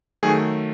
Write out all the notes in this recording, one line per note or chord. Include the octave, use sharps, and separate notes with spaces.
D#3 F#3 A3 G#4